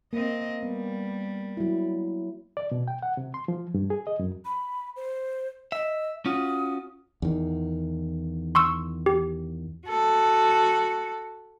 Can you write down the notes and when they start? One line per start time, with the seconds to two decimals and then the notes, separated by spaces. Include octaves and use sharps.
0.13 A#3 C4 D#5
0.63 G3 B3
1.57 F#3 E4
2.57 D5
2.71 B2
2.88 G5
3.03 F#5
3.17 C3
3.34 C6
3.48 F3
3.74 G2
3.90 G#4
4.07 D#5
4.19 F#2
4.45 B5
4.96 C5
5.72 D#5 E5
6.26 C#4 F4 F#4 D#6
7.22 E2 D#3
8.55 C6 C#6 E6
9.06 G4
9.87 F#4 A4